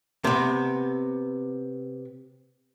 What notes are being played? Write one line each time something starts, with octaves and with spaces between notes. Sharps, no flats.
C3 B3